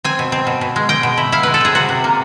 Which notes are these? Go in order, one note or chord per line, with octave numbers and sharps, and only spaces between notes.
C4 G#5
B2
C4
B2
B2
G#3
G#3 G5
B2
E4
E4 F5
G#3 B4
A4
C4 G#4
C3 F#4
C3
A#3